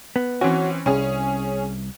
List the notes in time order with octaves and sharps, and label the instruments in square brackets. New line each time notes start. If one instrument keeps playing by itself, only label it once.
[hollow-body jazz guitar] B3
[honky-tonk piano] E3 C4 C#4 [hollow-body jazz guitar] F#4
[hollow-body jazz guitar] C2 [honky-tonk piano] C#4 G#4